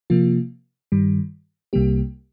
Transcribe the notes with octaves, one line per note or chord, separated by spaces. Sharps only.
C3 F3 A#3 F4
G2 D#3 G3
C2 C3 G3 A#3 G4